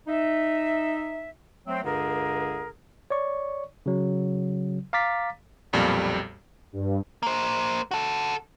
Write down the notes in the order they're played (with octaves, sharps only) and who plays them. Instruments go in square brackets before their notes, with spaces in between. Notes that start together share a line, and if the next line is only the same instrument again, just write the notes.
[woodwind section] D#4 E5
F#3 A3 C4
C#2 G2 D3 G#4 A#4
[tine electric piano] C#5 D5 C#6
C#3 F#3
F5 A#5 D6 A6 B6
[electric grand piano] B1 F2 A#2 G3
[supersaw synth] G2
[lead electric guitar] A#3 C5
F#4 A4